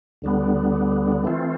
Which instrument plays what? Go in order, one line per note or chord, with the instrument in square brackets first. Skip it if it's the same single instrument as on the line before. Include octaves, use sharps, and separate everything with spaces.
[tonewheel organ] D2 D3 G3 B3
E3 A3 C4 F4